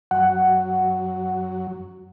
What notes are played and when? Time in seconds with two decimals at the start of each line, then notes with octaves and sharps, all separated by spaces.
0.11 F#2 F#3 F#5